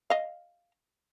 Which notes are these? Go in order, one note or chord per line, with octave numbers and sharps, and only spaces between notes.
D#5 F5